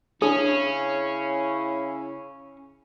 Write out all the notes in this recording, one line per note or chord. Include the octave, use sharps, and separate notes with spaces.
C#3 C#4 D4 E4 G#4